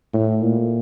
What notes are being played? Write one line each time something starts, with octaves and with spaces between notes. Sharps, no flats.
A2
A#2